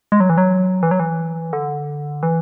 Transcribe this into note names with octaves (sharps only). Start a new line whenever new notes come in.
G#3
F#3
E3
F#3
E3
F#3
E3
D3
E3